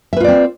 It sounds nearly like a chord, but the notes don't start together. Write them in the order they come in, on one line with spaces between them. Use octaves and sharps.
E5 B4 F4 D5 C4